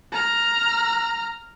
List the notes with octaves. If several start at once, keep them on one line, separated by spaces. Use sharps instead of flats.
A#5 F6